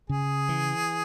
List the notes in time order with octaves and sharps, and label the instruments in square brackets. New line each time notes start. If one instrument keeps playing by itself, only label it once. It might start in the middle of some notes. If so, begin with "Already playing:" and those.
[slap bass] C#3 [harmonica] G#4
[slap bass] E3